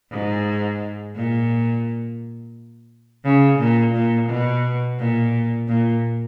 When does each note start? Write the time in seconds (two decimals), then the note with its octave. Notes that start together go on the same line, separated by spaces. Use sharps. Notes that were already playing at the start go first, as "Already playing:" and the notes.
0.11 G#2
1.15 A#2
3.24 C#3
3.59 A#2
3.94 A#2
4.29 B2
4.98 A#2
5.68 A#2